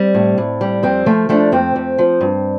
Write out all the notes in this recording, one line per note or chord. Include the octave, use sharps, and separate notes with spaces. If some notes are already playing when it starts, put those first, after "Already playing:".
Already playing: G3 C4
A2
A2
G3
F2 C4
F3 A3
F3 A3 D4
F2 C4
F2
F3
G2